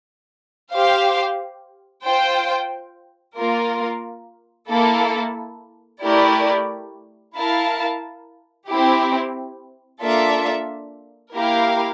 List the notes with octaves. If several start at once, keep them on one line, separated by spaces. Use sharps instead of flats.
G4 C5 F5
F4 C5 G5
A#3 F4 A#4
A#3 E4 A4
A3 E4 G4 A#4 D5
E4 A#4 F5 A5
C4 E4 G4
A#3 D4 F4 A4 E5
A#3 E4 G4 A#4 F5